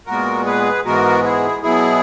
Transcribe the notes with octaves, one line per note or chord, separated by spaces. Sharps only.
A#2 G#3 B3 F#4 A#4
G#4 B4
G#2 E3 G#3 B3 F#4 A#4
E4 G#4
B2 F#3 B3 E4 G#4